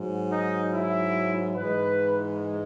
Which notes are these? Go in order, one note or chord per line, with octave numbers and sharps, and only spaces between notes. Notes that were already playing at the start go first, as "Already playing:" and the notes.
Already playing: G#2 F#3
D#4
E4
G#2 E3 G#3 B4